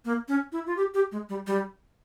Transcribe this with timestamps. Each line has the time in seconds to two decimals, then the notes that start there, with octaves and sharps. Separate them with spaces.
0.05 A#3
0.28 C#4
0.52 E4
0.66 F4
0.77 G4
0.94 G4
1.12 G#3
1.29 G3
1.47 G3